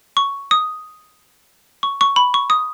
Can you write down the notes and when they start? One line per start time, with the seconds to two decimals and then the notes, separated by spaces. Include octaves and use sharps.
0.17 C#6
0.51 D#6
1.83 C#6
2.01 C#6
2.16 B5
2.34 C#6
2.50 D#6